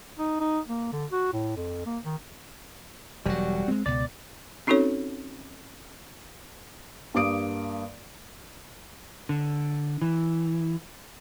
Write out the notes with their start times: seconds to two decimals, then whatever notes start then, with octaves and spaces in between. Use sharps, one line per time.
0.19 D#4
0.40 D#4
0.69 A#3
0.93 D3
1.12 F#4
1.33 A2
1.56 F2
1.86 A#3
2.04 D#3
3.26 E1 F#3 G3 F#4
3.68 G#3 C4
3.86 C#2 B2 D5
4.67 C4 C#4 D#4 F#4 A4 C#5
7.14 G2 A#3 D6 D#6 D7
9.29 D3
10.02 E3